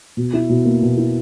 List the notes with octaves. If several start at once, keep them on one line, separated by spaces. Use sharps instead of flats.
B2
E4
B2
A#3
B2
E4